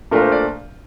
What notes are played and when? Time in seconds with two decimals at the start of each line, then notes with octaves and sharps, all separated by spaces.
0.11 A#2 A3 D4 F4 A#4
0.22 C5
0.32 D5